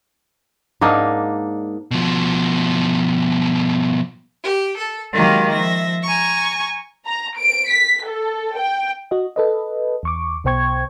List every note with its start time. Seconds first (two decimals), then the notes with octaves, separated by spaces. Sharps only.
0.81 G#2 A#3 D4 D#4
1.91 B2 F3
4.44 G4
4.78 A4
5.13 D#3 F#3 G#3 A#3 F4 G4
5.51 F3 E5 A#6
6.03 G#5 A#5 C#6
7.05 A#5
7.37 D7
7.70 B6
8.04 A4
8.58 G5
9.11 F#4 D#5
9.36 A4 B4 D#5
10.03 E2 C#6 D6
10.44 B1 B2 C5 G5 C#6 G#6